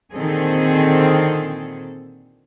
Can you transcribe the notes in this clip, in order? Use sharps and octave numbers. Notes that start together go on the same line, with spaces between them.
A#2 D3 D#3 C4 G#4 A4